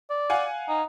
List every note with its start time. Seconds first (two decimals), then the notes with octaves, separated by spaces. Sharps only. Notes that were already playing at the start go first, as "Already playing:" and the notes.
0.10 D5
0.30 F5 F#5 G#5
0.69 D#4